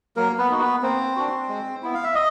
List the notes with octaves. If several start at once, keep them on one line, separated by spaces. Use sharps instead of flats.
F#3 A#3 A#4
B3 B4
A#3 D#4 F#4
B3 B4
A#3 C4 C5
D4 F#4
G#3
B3 E4
F5
E5
D#5